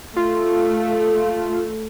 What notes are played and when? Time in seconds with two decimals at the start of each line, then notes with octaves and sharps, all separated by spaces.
0.17 A3 F4